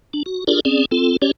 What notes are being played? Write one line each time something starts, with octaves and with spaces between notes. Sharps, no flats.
D4
F#4
D4 F4 G4 G#4 A#4 D5
C4 C#4 G#4 D5
C4 F4 A4
C#4 G4 C#5 D5